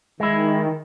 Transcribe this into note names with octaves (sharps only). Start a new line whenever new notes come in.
D#3 G#3 E4